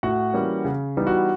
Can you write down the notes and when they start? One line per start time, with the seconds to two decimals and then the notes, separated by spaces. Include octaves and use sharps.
0.03 A2 F#4 F#5
0.33 E3 G3 A#3 C#4
0.65 C#3
0.97 E3 G3 B3 D#4
1.07 F#4 F#5